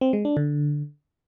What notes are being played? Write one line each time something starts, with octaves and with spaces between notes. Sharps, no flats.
C4
G#3
D4
D3